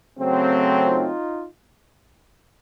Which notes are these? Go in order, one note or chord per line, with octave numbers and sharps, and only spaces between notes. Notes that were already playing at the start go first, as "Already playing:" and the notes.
C#3 F#3 A3 C4
D#4 F4